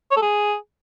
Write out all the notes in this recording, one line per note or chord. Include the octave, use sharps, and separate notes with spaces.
C#5
A4
G#4